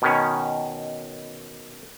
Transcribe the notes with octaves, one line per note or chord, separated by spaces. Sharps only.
B2 D#3 C#4